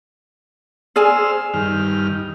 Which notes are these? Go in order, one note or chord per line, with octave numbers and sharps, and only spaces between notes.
G#4 C5 D5 G#5 E6 F6
G2 D#3 F6